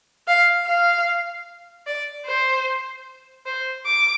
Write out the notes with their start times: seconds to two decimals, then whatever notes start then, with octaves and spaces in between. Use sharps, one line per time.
0.27 F5
0.66 F5
1.87 D5
2.26 C5
3.46 C5
3.86 D6